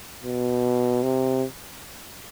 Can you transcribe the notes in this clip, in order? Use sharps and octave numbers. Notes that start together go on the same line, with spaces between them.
B2
C3